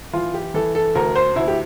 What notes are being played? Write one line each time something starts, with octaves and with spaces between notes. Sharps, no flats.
E3 F4
G4
E3 A4
A4
D2 A#4
C5
D2 E4
G4